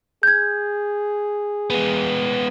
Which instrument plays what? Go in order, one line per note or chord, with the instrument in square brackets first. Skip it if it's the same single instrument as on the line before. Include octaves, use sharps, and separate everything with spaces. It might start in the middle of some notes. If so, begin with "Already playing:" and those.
[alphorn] G#4 [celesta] G6 G#6
[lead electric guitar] G#3 B3